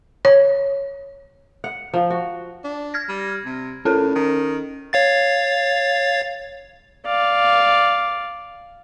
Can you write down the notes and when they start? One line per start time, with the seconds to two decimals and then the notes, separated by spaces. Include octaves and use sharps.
0.25 C#5
1.64 F#5
1.94 F3
2.10 F#4
2.64 D4
2.94 F6 G#6 A#6
3.09 G3
3.45 C3
3.85 A2 C#4 A4 A#4
4.16 D#3
4.93 C#5 F5 A6
7.06 D5 F5